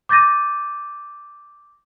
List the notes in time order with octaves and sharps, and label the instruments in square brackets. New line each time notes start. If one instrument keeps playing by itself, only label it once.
[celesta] D6 G6 A6 A#6 D#7